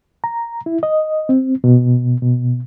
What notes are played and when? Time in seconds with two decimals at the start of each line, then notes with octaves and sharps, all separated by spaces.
0.24 A#5
0.66 E4
0.83 D#5
1.29 C4
1.64 B2
2.22 B2